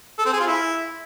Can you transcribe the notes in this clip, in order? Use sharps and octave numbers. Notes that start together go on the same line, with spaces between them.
A4
C4
G#4
F4
E4